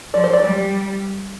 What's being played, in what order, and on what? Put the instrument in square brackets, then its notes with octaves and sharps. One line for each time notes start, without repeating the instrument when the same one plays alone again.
[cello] F3 [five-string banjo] D5
[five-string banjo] C5
D5
[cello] G3